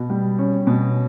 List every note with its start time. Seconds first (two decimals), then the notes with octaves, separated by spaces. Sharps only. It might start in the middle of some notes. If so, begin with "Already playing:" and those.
Already playing: B2
0.10 G3
0.39 C#4
0.67 B2